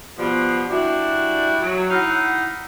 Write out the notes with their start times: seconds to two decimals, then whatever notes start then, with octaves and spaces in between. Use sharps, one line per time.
0.17 B2 F3 G3 B3
0.69 G3 D4 E4 F#4
1.62 F#3
1.90 D#4 E4 F5 F#5